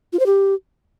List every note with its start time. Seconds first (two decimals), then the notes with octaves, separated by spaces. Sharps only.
0.13 F4
0.19 C5
0.26 G4